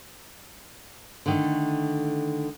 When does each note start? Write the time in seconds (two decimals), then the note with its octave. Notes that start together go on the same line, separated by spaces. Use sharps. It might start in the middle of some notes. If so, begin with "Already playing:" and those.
1.26 D3 D#3 A3